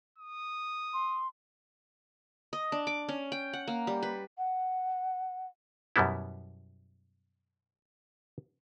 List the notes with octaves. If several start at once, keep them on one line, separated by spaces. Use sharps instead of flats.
D#6
C6
D#5
D4
D6
C#4
G5
F#5
A#3
G3
B4
F#5
F#2 B2 G3 B3 E4